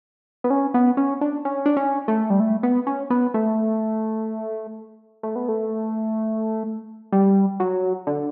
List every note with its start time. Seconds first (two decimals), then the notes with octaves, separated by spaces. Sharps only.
0.44 B3
0.50 C#4
0.74 B3
0.97 C#4
1.21 D4
1.45 C#4
1.66 D4
1.77 C#4
2.08 A3
2.30 G3
2.40 A3
2.63 B3
2.87 C#4
3.10 B3
3.34 A3
5.23 A3
5.36 B3
5.49 A3
7.12 G3
7.60 F#3
8.07 D3